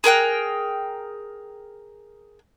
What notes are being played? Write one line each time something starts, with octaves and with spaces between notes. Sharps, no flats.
G#4 A#4 G5 F#6